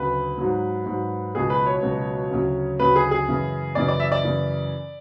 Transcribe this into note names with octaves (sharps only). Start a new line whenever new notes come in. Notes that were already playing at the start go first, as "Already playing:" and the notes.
Already playing: D2 C#3 F#3 B4
G#2 F#3
G#2 F#3
C#2 B2 F#3 G#4
B4
C#5
C#2 B2 F#3
D2 C#3 F#3
D2 C#3 F#3 B4
G#4
G#4
F#2 C#3 E3
F#2 C#3 E3 D5
D5
E5
D5
F#2 C#3 E3